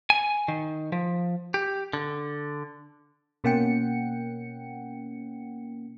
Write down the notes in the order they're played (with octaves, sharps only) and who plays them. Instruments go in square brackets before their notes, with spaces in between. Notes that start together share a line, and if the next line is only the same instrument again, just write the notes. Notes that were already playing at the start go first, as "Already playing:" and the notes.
[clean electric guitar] G#5
D#3
F3
G4
D3
[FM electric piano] B2 A#3 C#4 F#5 G5 C#7